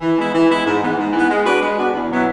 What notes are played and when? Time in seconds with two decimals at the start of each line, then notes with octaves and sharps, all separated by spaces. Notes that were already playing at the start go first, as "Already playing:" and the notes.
0.01 E3
0.17 G#3 B3 E4
0.33 E3
0.49 G#3 B3 E4
0.65 G#2
0.81 E3 B3
0.97 G#2
1.13 E3 B3
1.29 G#3
1.45 B3 D4 F#4 B4
1.62 G#3
1.78 B3 D4 F#4 B4
1.94 E2
2.10 B2 F#3 B3 E4